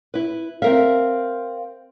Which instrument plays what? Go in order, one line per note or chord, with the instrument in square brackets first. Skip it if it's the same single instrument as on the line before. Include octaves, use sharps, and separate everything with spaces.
[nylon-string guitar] E4 B4
[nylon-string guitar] C4 A#4 E5 [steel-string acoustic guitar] F5